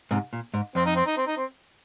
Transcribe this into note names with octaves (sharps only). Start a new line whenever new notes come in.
G#2 C3
A#2
G#2
F2 C4
D#4
C4
D#4
C4
D#4
C4